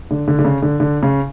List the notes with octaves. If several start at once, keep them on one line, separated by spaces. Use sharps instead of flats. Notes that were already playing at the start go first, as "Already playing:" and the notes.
D3
D3
D3
C#3
D3
D3
C#3